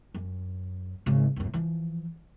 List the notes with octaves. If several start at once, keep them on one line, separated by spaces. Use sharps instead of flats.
F#2
G#1 C#3
D1 F#2
E3 F3